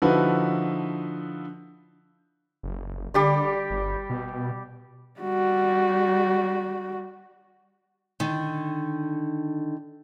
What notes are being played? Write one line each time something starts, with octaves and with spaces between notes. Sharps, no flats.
D3 F3 D#4 E4 F#4 B4
F#1
D3 G3 G4 D5
G1
B2
G3 F#4
D3 D#3